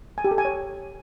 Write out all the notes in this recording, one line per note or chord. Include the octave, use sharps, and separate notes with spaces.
G#5
G4
A4
G#5
C#5